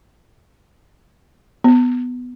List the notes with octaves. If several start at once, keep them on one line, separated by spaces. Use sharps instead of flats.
B3